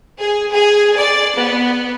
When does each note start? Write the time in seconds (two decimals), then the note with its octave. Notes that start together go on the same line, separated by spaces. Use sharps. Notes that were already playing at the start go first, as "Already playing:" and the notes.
0.19 G#4
0.52 G#4
0.97 D5
1.37 B3